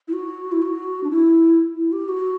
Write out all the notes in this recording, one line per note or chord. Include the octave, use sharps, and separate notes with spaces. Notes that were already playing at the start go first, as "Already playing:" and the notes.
E4
F#4
E4
F#4
D4
E4
E4
G4
F#4